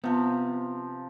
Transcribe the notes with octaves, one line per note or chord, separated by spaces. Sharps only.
C3 F3 B3